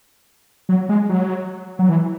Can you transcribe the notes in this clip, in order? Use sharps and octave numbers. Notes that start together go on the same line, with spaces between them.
F#3
G#3
F#3
F#3
E3